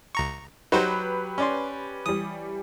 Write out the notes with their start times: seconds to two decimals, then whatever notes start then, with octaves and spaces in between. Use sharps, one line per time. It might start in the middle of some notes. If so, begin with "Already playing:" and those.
0.15 C#2 A#5 C#6
0.72 F#3 D#4 F#4 G4 B4 C5
1.38 C#4 D5 C6
2.06 E3 G3 D#6